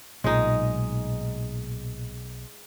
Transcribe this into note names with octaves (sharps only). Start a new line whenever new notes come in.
B1 A#2 G#3 D#4